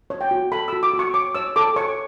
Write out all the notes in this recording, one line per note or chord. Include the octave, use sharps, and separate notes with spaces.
C#5
G5
F#4
A4 B5
F#4 E6
D6
F#4
C#6
C#5 D6
C#5 E6
A4 D6
C#5 C#6